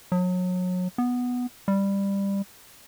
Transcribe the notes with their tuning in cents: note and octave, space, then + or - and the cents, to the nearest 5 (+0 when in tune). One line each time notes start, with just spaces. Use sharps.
F#3 -30
B3 +0
G3 +15